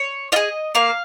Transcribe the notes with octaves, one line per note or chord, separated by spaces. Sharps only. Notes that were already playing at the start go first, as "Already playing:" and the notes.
Already playing: C#5
F4 G#4 D#5
A#3 F5